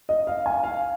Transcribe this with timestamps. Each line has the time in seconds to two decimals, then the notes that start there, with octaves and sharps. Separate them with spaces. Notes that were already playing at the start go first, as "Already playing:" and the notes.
0.09 D#5
0.27 F5
0.46 G#5
0.64 F5